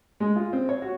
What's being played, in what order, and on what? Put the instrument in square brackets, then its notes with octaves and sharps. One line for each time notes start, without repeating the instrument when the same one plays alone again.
[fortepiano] G#3
F4
C4
C#5
F#4